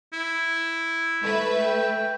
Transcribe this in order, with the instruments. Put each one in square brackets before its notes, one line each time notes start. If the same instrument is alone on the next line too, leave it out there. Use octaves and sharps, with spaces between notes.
[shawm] E4
[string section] A3 B4 E5
[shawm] G5